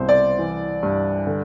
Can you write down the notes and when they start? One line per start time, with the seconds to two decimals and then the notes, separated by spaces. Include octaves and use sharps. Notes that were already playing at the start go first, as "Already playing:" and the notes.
Already playing: C2 B2 C5
0.09 D5
0.39 E3
0.83 G2
1.27 D3